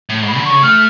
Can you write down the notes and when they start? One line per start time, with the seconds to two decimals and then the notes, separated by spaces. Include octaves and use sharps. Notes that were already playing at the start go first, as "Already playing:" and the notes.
0.09 A2
0.22 G#2
0.28 B5
0.37 D3
0.45 C#3 C#6
0.62 A3 F6